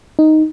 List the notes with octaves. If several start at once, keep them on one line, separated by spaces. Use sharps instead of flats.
D#4